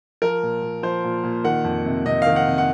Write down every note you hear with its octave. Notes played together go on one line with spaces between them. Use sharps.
F3 A#4
A#2
A#2
F3 C5
A#2
A#2
D#3 F#5
F2
C3
C3 D#5
F5
D#3
F#5
C3
F#5